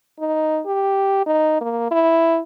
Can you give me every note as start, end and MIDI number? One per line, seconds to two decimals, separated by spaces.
0.19 0.61 63
0.66 1.26 67
1.26 1.56 63
1.61 1.88 58
1.91 2.39 64